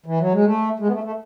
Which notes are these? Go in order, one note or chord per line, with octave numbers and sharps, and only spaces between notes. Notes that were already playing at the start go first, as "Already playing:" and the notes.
E3
F#3
G#3
A3
G#3
B3
A3
A3